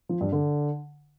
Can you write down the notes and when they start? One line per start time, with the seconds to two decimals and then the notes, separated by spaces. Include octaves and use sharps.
0.09 F3
0.21 G2
0.32 D3